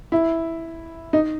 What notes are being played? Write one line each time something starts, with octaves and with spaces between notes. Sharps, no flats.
E4
D#4